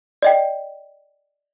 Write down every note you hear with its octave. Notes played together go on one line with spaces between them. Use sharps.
D5 D#5 G5